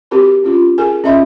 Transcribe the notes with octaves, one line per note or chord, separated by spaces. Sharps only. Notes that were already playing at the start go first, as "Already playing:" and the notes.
C4 F#4 G4 A#4 B5
C#4 F4
G#4 A#4 G#5
C#4 F4 D#5 E5 B5 C6